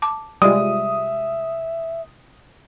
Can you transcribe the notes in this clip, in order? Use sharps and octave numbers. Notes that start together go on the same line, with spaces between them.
A5 D6
C3 G3 G#3 F4 G4 D5 E5 D#6